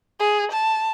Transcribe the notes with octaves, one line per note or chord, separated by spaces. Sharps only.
G#4
A5